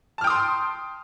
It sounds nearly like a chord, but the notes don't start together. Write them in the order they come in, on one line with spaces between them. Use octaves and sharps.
A5 F6 G5 D#6 C6